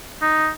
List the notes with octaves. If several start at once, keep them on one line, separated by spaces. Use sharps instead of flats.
D#4